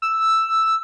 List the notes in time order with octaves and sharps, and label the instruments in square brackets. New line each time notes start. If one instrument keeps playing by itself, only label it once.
[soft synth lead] E6